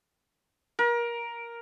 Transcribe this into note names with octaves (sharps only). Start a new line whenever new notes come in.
A#4